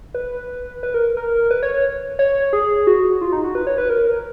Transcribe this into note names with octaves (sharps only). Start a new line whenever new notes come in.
B4
B4
A#4
A#4
B4
C#5
C#5
C#5
G#4
F#4
F4
D#4
F#4
B4
C#5
B4
A#4